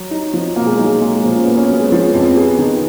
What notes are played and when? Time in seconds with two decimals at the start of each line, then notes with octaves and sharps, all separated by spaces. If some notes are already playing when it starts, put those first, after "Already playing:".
Already playing: F#3
0.11 D#4
0.34 F3
0.56 B2 A#3
0.66 G#3
0.77 F#3 D#4
0.86 G#3
1.01 A#2 G#3
1.23 A#2 F3
1.35 C#4
1.46 A#3 B3
1.58 C#4
1.68 F#3 B3
1.80 G#3
1.91 F3 B3
2.14 F2
2.37 B3 G#4
2.59 D#3